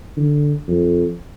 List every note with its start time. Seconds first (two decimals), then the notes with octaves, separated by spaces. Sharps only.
0.17 D3
0.68 F2